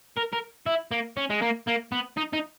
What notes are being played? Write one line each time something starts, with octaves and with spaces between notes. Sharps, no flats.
A#4
A#4
E4
A#3
C#4
G#3
A#3
A#3
B3
D#4
D#4